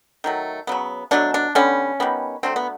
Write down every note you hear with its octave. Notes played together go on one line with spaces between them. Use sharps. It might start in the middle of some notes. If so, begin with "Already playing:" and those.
D#3 F#3 A3
C#3 F#3 B3
B2 F#3 A3 D4
D4
D3 G3 B3 C#4
D#3 G3 B3
D3 F#3 A3 C4
B3